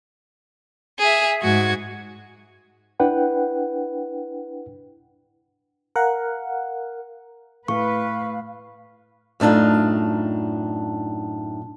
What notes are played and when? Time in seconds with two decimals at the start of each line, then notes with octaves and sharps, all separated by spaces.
0.99 G#4 E5
1.41 G#2 F#4 G#6
3.00 D4 E4 B4 F#5 G5
5.96 A#4 F5 F#5
7.68 A2 B4 F5 C#6
9.40 F#2 A2 D4 D#4 F4